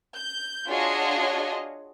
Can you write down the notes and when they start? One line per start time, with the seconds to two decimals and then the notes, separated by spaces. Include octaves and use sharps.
0.15 G6
0.67 D4 F4 F#4 G#4 C#5 D#5